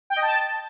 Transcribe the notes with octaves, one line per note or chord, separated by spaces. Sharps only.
G5
D#5
A5